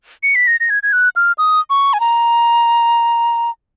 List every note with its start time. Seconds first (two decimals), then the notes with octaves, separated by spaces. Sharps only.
0.23 C#7
0.35 B6
0.47 A#6
0.60 A#6
0.70 G#6
0.83 G#6
0.93 F#6
1.16 F6
1.38 D#6
1.70 C#6
1.93 G#5
2.00 A#5